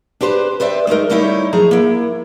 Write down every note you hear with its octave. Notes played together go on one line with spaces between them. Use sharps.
D4 G4 B4 C5
B4 C5 D5 E5 G5
G#3 A3 D#4 A#4
G3 A3 D#4 E4 C#5
F3 A3 G#4 A#5
A#3 E4